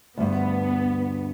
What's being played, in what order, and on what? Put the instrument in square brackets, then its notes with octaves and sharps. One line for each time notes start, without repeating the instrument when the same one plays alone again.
[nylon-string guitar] D2 G2 [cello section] B3